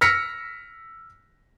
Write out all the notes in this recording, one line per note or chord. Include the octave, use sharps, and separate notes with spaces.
E6 F6 A#6 B6 C#7